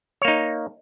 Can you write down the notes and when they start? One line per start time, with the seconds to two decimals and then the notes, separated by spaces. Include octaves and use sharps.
0.22 C#5
0.25 A#3
0.28 D#4